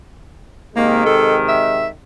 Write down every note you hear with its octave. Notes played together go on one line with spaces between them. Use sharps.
C3 D#3 G#3 A#3
A4
E5